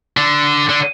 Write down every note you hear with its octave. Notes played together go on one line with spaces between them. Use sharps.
D3
D3